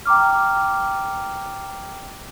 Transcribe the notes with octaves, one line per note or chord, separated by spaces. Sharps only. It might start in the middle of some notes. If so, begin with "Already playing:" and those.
G5 A#5 D6 F6